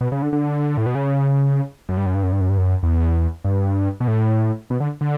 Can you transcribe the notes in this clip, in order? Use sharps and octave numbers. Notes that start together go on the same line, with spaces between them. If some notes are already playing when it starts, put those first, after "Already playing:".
B2
C#3
D3
D3
A2
B2
C#3
F#2
G2
F#2
G2
F#2
G2
F#2
G2
F#2
E2
G2
B2
A2
B2
D3
D3